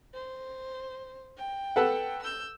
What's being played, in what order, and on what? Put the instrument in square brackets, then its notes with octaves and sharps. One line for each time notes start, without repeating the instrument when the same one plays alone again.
[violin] C5
G5
[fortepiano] A4 B4 F#5
[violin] E6 G6